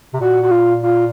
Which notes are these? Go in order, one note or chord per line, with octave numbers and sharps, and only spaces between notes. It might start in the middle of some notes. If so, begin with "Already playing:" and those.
C3
A#2 F#4
F#4
F4
F4